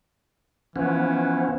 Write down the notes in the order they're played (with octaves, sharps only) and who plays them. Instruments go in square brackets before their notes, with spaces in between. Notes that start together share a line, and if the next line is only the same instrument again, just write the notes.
[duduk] E3 [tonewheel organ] F3 B3 C#4